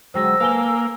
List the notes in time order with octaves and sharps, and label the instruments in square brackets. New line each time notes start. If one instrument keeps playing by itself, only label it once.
[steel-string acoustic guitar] D3 F#3 G#3 [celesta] C5 G5 A#6 [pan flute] E6
[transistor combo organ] A#3 [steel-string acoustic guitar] A4 F5 [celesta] B4 G#5 G7